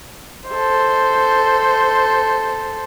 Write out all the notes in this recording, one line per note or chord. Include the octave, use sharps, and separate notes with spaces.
A4 C5